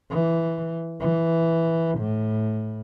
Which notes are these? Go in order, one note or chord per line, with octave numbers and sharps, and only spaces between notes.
E3
E3
A2